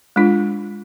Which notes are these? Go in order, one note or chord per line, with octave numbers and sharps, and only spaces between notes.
G#3 D4 F4